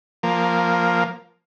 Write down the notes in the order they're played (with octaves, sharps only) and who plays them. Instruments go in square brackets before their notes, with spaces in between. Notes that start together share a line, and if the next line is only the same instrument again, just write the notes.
[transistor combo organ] F3 A#3